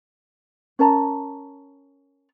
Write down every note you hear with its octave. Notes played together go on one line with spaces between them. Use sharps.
C#4 A#4 A5 A#5